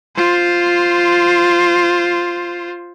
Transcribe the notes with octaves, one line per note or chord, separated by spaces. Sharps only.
F4 C5